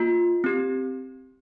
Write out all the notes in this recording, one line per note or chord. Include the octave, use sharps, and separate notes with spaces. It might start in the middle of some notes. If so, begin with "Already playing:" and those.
Already playing: A#3 F4
C4 G4